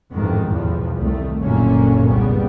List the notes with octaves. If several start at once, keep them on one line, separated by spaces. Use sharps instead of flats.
A1 F2 G#2 D#3
B1 E2 F3
C2 D#3 A3
F#1 F#2 A#2 D3 A#3 C#4
G1 C2 C#3 G3 B3